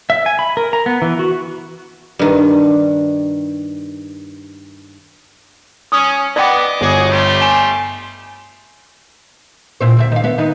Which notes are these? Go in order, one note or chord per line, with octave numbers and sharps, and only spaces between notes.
E5
G#5
B5
A#4
A#5
B3
E3
F#4
G2 D#3
C#4 D#6
B3 D5 D#5 G5 D6
G1 F#4 G#4
G3 A3 C6
G#5 D7 E7
A#2 E4 C5
D2 C4 E5
D#3 F5
B3 E5
D#3 B3 D#4